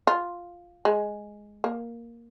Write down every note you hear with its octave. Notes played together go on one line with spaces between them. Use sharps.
F4
G#3
A#3